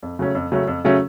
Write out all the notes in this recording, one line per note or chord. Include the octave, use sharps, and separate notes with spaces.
F2
C#3 F#3 A3 C#4
F2
C#3 F#3 A3 C#4
F2
C#3 F#3 A3 C#4